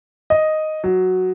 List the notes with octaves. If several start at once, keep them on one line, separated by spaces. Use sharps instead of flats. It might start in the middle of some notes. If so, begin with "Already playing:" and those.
D#5
F#3